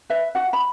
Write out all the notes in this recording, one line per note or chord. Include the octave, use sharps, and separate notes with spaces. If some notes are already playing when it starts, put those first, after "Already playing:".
B4 E5
F#4 F#5
B5